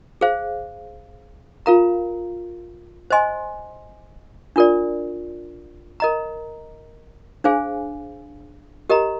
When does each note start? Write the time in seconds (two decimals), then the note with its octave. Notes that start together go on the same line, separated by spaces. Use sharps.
0.21 G#4 C5 F5
1.66 F4 A#4 F5 A#5
3.11 C5 D#5 G#5 C6
4.56 D4 F4 A#4 D5
6.00 A#4 D#5 A#5
7.44 D4 G#4 C5 F5 G#5
8.90 G4 A#4 D#5 A#5